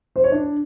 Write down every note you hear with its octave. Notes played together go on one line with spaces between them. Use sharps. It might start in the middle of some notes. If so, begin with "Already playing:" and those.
C5
C#5
D4